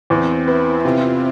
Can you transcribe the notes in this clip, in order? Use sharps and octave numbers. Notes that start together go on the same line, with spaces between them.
E2 C4
B3 E4
C3 F4